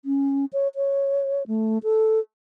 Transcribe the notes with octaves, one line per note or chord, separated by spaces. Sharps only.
C#4
C#5
C#5
A3
A4